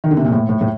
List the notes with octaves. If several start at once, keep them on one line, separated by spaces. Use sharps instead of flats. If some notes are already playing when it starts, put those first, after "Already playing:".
D#3
D3
C3
A#2
A2
A2
A2